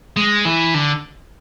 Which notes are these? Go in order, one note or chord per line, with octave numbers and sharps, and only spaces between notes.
G#3
E3
D3